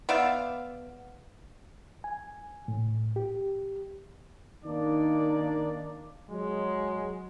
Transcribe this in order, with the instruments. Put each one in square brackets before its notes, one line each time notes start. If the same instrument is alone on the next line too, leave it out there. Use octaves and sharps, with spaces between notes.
[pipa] B3 D5 E5 F5
[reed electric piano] G#5
A2
G4
[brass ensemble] D#3 A#3 D4 D#4 D5
F#3 G#3